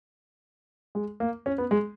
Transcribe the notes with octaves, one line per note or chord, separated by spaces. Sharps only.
G#3
A#3
C#4
B3
G#3